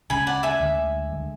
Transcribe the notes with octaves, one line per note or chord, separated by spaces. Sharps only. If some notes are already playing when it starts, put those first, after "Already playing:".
D2 C#3 G#3 C#4 G#5 B5
D5 F#5
E5 G#5
D2 D3 G#3
D3 G#3